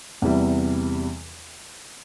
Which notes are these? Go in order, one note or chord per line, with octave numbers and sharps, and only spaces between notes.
E2 C3 E3 G3